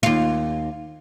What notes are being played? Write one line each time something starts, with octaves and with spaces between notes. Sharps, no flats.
D#2 F4